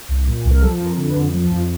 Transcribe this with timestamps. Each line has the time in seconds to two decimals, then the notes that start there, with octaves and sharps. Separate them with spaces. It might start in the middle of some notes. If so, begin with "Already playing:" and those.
0.08 C2
0.27 A#2
0.44 C2
0.51 A#4
0.62 F3 A4
0.80 F2
0.86 A#4
0.97 D3
1.10 B4
1.16 F2
1.34 F3
1.51 F2